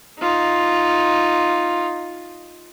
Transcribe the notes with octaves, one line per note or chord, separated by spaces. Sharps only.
D#4 F4